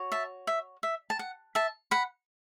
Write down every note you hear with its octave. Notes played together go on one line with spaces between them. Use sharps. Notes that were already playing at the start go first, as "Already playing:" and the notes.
Already playing: F#4 C#5
E5 A5
E5
E5
A5
F#5
E5 A5
F#5 B5